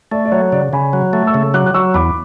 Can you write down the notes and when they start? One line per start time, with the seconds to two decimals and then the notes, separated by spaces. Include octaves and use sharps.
0.12 A3 D5
0.25 D5
0.32 F#3 C#5
0.52 C#3 D5
0.73 C#3 G#5 B5
0.93 F#3
1.13 A3
1.27 C#6 E6
1.34 C#3
1.54 F#3 D6 F#6
1.66 F#6
1.74 F#3 C#6 E6
1.94 E2 B5 D6